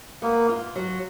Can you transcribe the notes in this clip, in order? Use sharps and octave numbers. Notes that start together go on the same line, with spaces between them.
A#3 B3
F4
F#3